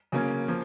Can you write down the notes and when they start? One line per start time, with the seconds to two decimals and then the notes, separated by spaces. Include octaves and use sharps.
0.12 C#3 F#3 A#3 C#4
0.48 F3 A#3